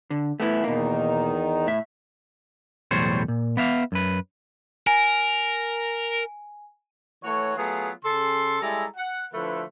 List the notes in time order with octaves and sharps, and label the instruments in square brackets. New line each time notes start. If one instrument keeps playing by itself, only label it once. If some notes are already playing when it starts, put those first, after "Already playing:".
[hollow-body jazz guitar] D3
A3 B3 E4
[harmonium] E2 D#3 D#4 [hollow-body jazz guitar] B2 A#3
[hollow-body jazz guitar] A2 E5
[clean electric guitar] B1 E2 A2 G3 C5 C#5
A#2
B3 E5 F5
F#2 B4
[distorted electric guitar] A#4 [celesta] G#5
[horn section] E3 A3 F#4 C#5
F#3 A3 B3 F4 G#4
C#3 A4 C6
G3 G#3 E4 A4 G#5 A#5
F#5
D3 F3 A3 E4 B4